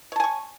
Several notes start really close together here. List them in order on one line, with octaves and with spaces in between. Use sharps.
C#5 A5 G#5 C#6